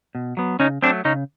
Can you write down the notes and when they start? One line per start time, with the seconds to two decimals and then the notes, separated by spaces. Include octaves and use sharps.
0.15 B2
0.37 F#3 B3
0.59 C#3 C#4 D#4
0.82 F#3 A3 C4 D4
1.05 C#3 C#4 D#4